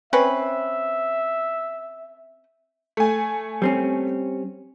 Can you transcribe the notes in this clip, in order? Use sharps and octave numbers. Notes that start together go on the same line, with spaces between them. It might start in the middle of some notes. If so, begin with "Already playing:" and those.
C4 C#4 B4 E5
A3 G#5
G3 C4 C#4